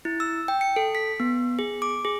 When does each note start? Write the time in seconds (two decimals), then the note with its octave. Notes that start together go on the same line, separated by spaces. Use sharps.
0.05 E4
0.20 E6
0.48 G5
0.61 C#7
0.76 A4
0.95 B6
1.20 B3
1.59 G#4
1.82 D6
2.05 G#4